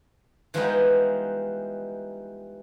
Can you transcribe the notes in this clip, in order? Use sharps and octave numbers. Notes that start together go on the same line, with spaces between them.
E3 F3 G3 G#3 B3 D#4